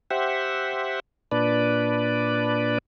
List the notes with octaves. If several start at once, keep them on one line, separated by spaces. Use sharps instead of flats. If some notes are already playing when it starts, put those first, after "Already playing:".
G4 C5 E5 F#5
A#2 D4 B4 D5